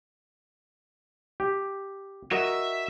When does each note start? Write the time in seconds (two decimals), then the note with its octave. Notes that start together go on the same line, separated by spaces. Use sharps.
1.40 G4
2.31 F#4 A#4 D#5 E5